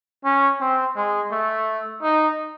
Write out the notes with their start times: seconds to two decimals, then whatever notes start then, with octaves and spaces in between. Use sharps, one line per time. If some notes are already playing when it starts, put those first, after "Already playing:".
0.24 C#4
0.60 C4
0.96 G#3
1.31 A3
2.02 D#4